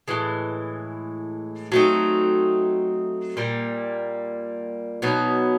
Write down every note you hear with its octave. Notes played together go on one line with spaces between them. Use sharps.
A2 E3 G#3
F#3 A3 C4 D#4
A#2 G3 A#3
B2 F#3 B3 D#4